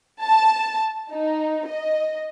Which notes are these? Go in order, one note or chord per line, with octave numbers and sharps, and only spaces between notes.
A5
D#4
D#5